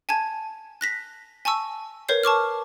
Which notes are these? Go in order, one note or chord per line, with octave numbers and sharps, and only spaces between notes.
G#5 A5 G#6
F#6 A#6 B6
G#5 A5 C#6 E6
A#4 B4 C#5 G6 C7
A5 C#6 D6 F6